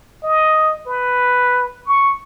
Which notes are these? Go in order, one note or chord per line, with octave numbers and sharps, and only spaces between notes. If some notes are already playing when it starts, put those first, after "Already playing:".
D#5
B4
C#6